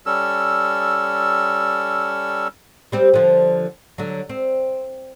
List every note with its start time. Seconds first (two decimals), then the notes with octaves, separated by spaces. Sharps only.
0.06 G3 C#4 A4 E6
2.92 G3 C4 G4
3.14 D3 F3
3.98 D3 F#3
4.29 C4